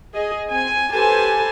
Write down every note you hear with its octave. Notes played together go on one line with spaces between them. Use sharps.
G#4 D#5
C4 G#5
G4 A4 B4 C5 G#5 A5